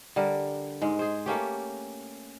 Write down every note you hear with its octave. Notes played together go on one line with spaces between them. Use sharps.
D3 G3 A#4
G#2 G#3
G#4 C5
A3 A#3 C#4 G4